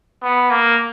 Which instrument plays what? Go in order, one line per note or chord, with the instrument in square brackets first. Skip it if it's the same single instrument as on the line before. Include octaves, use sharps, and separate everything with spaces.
[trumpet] B3
A#3